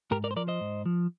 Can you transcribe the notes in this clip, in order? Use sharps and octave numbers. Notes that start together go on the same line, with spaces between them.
G#2 G4 A#4
A#4 D5
C5
F3 A#4 D5
C5 D#5
G#2
F3